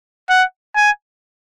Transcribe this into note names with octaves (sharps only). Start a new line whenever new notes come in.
F#5
G#5